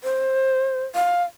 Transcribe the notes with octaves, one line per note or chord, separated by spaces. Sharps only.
C5
F5